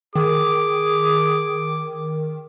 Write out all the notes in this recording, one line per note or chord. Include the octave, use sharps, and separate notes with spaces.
D#3 G#4 D6